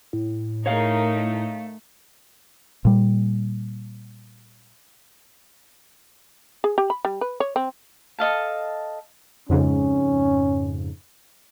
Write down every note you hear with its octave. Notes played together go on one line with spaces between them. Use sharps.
A2
A3 D#4 A#4 C#5 F5
A#2 G3
G#4
G4
B5
G3
B4
C#5
C4
A4 D#5 F5 A5
F2 G#2 C#3 C#4